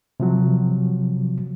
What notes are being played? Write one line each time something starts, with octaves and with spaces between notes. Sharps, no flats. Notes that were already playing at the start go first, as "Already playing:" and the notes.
C3 F3 F#3